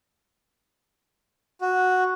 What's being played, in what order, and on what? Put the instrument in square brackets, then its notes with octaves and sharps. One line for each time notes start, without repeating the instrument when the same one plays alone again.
[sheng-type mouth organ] F#4